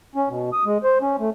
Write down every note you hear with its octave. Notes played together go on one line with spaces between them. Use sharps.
C#4
B2
D#6
G#3
C5
C#4
A3